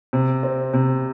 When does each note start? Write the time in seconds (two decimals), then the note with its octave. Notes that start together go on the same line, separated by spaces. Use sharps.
0.13 C3
0.43 C4
0.74 C3